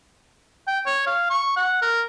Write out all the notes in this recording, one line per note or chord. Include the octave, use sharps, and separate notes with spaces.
G5
C#5
F5
C#6
F#5
A#4